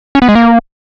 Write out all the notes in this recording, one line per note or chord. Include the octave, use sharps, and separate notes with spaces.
C#4
B3
G#3
A#3